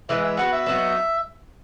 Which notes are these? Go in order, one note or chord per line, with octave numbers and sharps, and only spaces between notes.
E3 G#3 B3 E5
E5
B3 F#4 B4 F#5
E5
F#3 B3 D#4 F#4